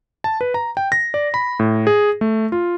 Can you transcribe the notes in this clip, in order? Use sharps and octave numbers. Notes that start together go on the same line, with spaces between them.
A5
B4
A#5
G5
A#6
D5
B5
A2
G#4
A3
F4